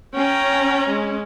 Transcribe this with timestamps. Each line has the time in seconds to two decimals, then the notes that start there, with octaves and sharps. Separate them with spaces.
0.16 C#4 G5 A#5
0.89 G#3